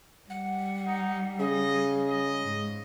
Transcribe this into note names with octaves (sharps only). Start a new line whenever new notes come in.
G3 F#5
D#4
C#3 G#4 D#5
D#5
G#2